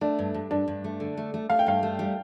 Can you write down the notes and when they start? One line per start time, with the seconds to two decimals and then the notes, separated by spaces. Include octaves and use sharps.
0.01 A3 D4
0.19 G2
0.34 G2
0.51 G2 D4
0.68 G2
0.84 A3
1.00 D3
1.17 A3
1.34 A3
1.50 A3 F5
1.59 G5
1.67 G2 F5
1.83 A3
1.99 G3